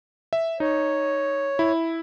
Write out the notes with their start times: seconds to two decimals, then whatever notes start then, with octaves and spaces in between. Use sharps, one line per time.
0.33 E5
0.60 D#4 C#5
1.59 E4